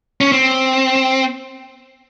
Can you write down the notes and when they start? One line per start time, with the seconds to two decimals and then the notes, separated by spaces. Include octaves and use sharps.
0.21 C#4
0.32 C4